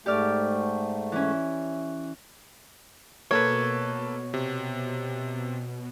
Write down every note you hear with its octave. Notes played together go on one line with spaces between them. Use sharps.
G#2 A3 G4 D5 F6
E3 C#4
B2 A#3 A4 B4 C#5
C3